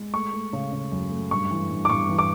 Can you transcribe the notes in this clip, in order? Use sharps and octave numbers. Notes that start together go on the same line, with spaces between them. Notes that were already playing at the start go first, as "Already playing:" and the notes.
Already playing: G#3
A3 C#6
A3
C#3
C#3
F#2
A3
G2 C#6
E3
G2
D6
G2 C#6
E3
D6